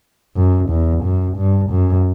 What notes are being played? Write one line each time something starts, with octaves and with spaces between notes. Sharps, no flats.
F#2
E2
F#2
G2
F#2